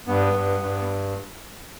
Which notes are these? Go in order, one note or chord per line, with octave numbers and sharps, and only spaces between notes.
G2 B3
G2
G2